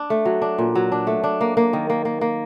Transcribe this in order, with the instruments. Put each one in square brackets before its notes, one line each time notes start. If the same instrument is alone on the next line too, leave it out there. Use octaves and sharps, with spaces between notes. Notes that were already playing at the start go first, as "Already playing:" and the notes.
Already playing: [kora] D4
A3
F#3
D4
A#2
F#3
D4
A3
D4
A#3
A#3
D#3
A#3
A#3
A#3